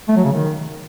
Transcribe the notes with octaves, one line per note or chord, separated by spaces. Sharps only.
A3
F#3
C#3
D#3